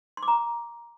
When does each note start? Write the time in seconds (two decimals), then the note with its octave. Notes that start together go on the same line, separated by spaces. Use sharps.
0.17 C6
0.23 D6
0.28 A#5